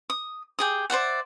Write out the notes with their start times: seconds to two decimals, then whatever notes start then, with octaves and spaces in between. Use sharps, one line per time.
0.10 D#6
0.59 G4 G#4 D#6
0.90 C5 D5 E5 F#5